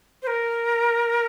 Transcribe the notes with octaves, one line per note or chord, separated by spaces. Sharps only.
C5
A#4